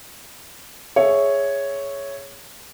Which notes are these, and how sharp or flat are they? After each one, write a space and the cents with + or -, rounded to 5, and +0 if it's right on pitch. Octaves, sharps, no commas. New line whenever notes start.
G#4 +0 C#5 +0 E5 +0